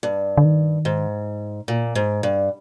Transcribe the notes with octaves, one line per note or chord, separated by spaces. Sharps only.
G2
D3
D#3
G#2
A#2
G#2
G2